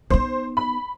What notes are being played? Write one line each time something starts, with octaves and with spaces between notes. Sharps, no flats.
B3 D#4 C5
B5